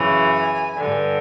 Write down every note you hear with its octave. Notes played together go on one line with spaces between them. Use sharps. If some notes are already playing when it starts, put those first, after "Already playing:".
Already playing: F#2 C#3 E3 G#5
G2 D3